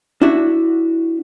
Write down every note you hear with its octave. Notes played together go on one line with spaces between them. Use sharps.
D4 E4 F#4 E5